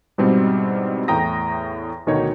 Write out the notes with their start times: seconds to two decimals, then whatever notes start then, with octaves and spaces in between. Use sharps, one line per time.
0.18 G#2 B2 G3 C4 E4
1.08 E2 A2 G5 A#5 D#6 A#6
2.07 D2 B2 D#3 D#4 C#5